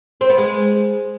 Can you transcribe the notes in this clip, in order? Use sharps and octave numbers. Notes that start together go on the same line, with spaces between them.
C4
B3
G#3